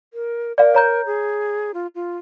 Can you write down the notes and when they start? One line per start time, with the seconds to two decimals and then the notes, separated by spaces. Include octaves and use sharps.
0.14 A#4
0.58 A#4 D5 F5
0.75 C#5 A#5 G6
1.06 G#4
1.74 F4
1.95 F4